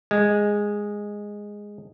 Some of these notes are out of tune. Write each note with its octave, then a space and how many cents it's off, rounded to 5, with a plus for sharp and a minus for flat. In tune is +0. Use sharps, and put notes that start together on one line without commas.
G#3 -10